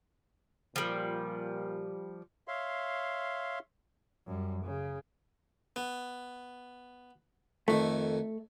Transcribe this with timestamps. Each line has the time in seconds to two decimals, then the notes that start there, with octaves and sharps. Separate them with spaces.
0.76 A#2 F3 G3
2.48 C#5 E5 F5 C6
4.27 F#2 G3
4.64 C#3
5.76 B3
7.68 F2 D#3 A3